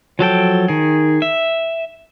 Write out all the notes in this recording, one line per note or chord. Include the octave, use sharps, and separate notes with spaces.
F3 F#3 A4 G5
D#3 G#4
E5